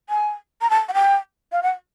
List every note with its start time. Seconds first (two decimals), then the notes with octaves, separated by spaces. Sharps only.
0.09 G#5
0.61 A#5
0.70 A5
0.89 F#5
0.94 G5
1.52 F5
1.63 F#5